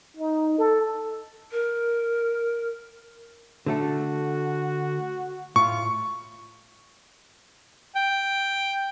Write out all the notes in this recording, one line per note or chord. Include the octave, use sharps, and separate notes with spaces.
D#4
A4
A#4
D3 A3 F#4 A4
A2 F4 C#6
G5